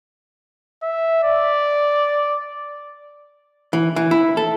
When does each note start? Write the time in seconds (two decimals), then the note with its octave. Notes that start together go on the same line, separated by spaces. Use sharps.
0.83 E5
1.23 D5
3.73 E3
3.96 E3
4.11 E4
4.37 A4